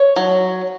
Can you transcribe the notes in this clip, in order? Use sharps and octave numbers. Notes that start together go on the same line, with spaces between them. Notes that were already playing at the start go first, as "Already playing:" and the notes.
Already playing: C#5
F#3